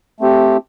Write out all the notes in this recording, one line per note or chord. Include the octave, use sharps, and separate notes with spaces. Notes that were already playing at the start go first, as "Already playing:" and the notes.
A3 C4 G4